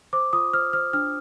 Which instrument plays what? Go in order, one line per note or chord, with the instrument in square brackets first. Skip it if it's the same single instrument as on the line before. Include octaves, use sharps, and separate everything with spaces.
[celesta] C5 D6
F4 D#6
C5 F6
C5 F6
D4 F6